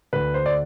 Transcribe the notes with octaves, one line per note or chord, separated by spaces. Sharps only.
D2 D3 B4
C5
D5